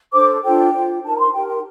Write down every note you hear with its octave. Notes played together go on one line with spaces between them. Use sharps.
D4 A4 C5 D6
D4 F4 A4 C5 G5
F4 C5
D#4 A#4 A5
A#5
C6
D#4 G4 A#4 G5
G5